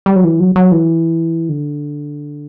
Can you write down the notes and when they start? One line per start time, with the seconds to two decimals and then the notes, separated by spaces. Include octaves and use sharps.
0.06 G3
0.16 F#3
0.24 E3
0.40 F#3
0.56 F#3
0.72 E3
1.49 D3